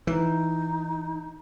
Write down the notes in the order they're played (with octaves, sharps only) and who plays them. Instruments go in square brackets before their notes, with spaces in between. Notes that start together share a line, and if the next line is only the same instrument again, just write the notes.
[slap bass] E3 [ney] D#4